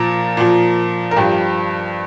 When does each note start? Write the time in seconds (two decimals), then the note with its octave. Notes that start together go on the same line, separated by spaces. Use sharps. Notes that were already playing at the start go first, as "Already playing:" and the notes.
Already playing: A#2 F3 A#4
0.37 A#2 F3
1.11 A#4
1.16 G2 F3 G4